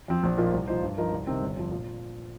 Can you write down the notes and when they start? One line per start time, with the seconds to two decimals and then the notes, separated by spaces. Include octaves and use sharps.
0.08 F2 F3 C4
0.23 A#1
0.38 A#2 F3 A#3 D#4
0.53 C2
0.68 A#2 F3 D#4 C5
0.82 G2
0.98 F3 D#4 A#4
1.12 C2
1.27 C3 D#3 C4
1.42 G1
1.57 F2 F3
1.72 A#2